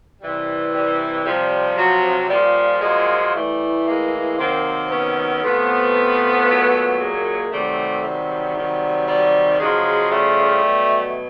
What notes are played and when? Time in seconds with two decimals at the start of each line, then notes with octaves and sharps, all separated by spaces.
0.21 C3 E3 G3
0.74 G3
1.25 C3 F3 G3
1.77 F#3
2.30 A#2 F3 G3
2.82 F#3 G#3
3.34 A2 E3 G3 A3
3.86 G#3 A#3
4.38 C3 D#3 F#3 A#3 C4
4.90 B3 C#4
5.43 C3 F3 A3 B3
6.47 A#2 F#3
6.99 G#3 A#3
7.51 C3 D#3 F#3 G3 A3
8.04 G3
8.55 C3 D#3 F#3
9.08 G3
9.59 C#3 F3 F#3 G#3
10.11 G3 A3
10.64 B2 F#3